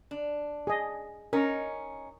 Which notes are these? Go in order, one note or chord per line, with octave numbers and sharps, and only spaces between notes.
D4
G#4 D#5
C#4 D#4 A#4